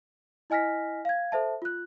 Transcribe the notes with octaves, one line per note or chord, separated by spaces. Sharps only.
E4 D#5 G#5 F6 A#6 B6
F5 G#6
A4 C5 E5 A5
F4 F#6